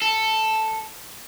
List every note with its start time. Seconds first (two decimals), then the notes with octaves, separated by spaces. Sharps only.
0.02 A4